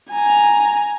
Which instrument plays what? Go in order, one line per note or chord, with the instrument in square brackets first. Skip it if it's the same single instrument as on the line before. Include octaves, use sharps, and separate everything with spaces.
[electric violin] G#5 A#5